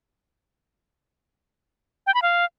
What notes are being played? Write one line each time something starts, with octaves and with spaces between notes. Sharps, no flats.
G5
B5
F5